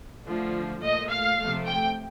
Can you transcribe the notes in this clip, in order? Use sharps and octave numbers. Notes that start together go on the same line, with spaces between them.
D3 F3 A3
A#2 A3 D#5
F5
C3 F3 A3
G5